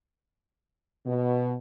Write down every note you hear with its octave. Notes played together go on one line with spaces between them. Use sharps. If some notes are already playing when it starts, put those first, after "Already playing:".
B2